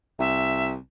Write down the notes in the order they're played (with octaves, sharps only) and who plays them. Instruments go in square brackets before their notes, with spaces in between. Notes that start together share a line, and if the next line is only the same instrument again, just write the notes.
[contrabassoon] C2 [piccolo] E5